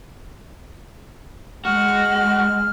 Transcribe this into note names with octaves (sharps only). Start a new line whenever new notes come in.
G#3 F#4 F6